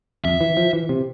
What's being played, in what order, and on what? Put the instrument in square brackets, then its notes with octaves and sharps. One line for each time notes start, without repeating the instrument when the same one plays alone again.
[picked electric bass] F2 [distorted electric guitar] E5
[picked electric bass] E3
F3
E3
C3